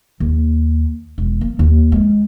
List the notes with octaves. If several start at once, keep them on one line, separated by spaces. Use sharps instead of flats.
D#2
E1
A#3
D#2
G#3